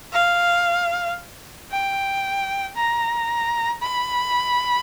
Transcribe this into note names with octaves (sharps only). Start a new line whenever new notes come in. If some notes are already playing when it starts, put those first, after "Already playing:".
F5
G5
A#5
B5